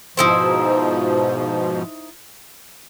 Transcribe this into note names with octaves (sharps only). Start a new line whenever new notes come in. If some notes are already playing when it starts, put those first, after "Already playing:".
G#2 B2 F3 D#4 E4 C5